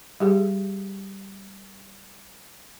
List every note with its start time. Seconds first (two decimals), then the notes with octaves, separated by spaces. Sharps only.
0.20 G3 G4 G#4